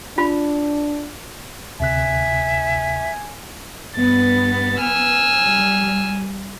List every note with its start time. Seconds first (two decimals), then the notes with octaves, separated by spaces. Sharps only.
0.18 D4 F4 B5
1.80 D2 C3 E5 G#5 F#6
3.97 G2 B3 A6
4.81 G#5 E6 F6
5.44 G3